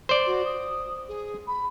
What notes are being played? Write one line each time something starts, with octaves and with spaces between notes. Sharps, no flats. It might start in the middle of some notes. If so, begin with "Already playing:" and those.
C5 D5
F#4
D#6
G#4
B5